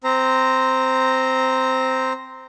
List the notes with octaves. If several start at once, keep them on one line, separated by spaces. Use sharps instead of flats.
C4 C5 A#5